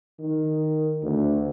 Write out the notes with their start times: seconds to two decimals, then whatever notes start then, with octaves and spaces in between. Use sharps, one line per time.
0.20 D#3
1.03 D2